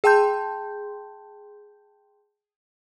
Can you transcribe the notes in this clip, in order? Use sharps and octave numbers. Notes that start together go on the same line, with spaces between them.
G#4 G5 A5 C6 G6